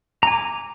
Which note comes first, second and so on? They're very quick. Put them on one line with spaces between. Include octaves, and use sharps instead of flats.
A#5 G#5 D6